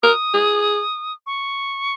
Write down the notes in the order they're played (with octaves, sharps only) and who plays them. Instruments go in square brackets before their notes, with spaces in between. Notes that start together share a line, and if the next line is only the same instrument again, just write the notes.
[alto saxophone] A#4 [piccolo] D#6
[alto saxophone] G#4
[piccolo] C#6